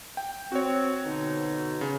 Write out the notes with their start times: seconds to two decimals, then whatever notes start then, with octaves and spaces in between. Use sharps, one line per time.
0.17 G5
0.52 C4 F#4 C#5
1.05 B2 D3 D#4
1.81 C#3